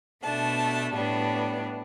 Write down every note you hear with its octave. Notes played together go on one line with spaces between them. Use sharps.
B2 A3 D4 A5
A2 G3 B3 D4